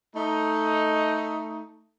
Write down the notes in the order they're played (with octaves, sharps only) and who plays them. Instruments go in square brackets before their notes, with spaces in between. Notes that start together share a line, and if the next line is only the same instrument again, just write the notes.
[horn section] A3 D#4